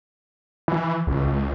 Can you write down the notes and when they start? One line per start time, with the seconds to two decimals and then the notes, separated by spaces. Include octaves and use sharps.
0.68 E3
1.07 C#2
1.28 C#2